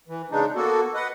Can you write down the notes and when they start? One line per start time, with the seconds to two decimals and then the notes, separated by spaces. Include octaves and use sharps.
0.08 E3
0.31 C#3 G#3 D4 D#4
0.55 A#3 B3 F#4 A4
0.94 B4 D#5 F#5